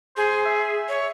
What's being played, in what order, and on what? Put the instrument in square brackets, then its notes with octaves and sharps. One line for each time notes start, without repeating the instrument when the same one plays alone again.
[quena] G#4 [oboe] C5
[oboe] E5
[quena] C#5